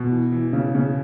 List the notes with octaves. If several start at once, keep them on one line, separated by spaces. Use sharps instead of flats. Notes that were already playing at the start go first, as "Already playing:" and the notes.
Already playing: B2
E3
E3
C#3
C#3